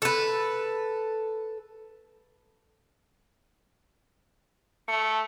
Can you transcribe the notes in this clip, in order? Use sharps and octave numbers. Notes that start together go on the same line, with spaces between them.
A4 B4
A3 C#7